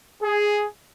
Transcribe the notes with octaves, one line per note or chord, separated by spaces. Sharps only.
G#4